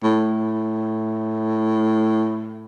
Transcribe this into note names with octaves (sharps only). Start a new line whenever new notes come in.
A2